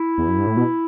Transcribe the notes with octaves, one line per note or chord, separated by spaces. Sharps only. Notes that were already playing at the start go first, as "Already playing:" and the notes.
Already playing: E4
E2
F#2
G2
A2
B2